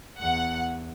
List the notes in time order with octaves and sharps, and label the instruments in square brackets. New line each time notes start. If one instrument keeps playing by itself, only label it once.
[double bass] E2 [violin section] F#5